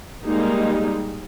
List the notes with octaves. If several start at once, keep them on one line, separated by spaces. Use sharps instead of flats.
G3 G#3 A#3 D#4